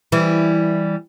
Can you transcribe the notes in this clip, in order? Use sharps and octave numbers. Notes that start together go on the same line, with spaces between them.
E3 G3